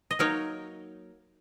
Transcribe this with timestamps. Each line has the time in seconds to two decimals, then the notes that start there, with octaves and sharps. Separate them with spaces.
0.11 D#5
0.19 F#3 A#3 D#4 A#4 C#5